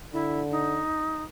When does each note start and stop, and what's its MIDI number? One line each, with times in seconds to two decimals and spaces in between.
0.13 0.84 50
0.13 0.41 64
0.51 1.23 63